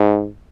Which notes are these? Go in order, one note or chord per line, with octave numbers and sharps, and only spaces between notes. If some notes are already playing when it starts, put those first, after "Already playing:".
Already playing: G#2